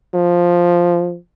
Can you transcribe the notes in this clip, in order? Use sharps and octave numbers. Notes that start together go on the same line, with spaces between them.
F3